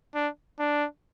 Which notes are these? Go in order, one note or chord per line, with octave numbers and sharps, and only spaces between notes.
D4
D4